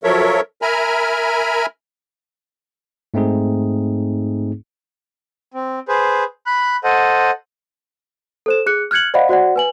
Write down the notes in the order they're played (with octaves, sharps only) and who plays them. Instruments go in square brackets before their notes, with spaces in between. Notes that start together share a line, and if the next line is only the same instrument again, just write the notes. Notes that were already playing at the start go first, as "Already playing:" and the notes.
[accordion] F3 F#3 A4 A#4 C#5 E5
A#4 E5 G#5 A#5 B5 F6
[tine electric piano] G#2 A3 C4 D#4 G#4
[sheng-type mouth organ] C4
G#4 B4 C5
B5 F#6
A4 C5 D#5 F#5
[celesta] A4 C5 E7
G#4 F#6 C#7
F6 F#6 G#6 C#7 F#7
C5 D5 D#5 F5 F#5 B5
F#4 C5 D5 F#5
B4 G#5 F#7